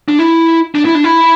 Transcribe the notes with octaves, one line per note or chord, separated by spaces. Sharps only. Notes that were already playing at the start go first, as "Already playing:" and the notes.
D4
E4
D4
E4
D4
E4